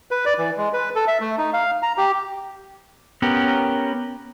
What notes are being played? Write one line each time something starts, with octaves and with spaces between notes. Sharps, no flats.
B4
D5
E3
G#3
B4
A4
E5
A3
D#4
F5
A#5
G4
B3 C#4 G4 A#4